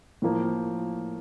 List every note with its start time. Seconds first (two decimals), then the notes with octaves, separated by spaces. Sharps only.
0.22 A2 F3 A#3